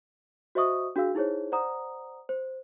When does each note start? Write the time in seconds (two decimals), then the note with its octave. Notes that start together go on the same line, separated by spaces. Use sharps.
0.55 F#4 C5 D#5 E5 C#6 D#6
0.96 D4 F#4 G#4 F5 E6
1.15 D#4 E4 G#4 C5 C#5
1.52 C5 D5 F#5 A#5 D#6
2.29 C5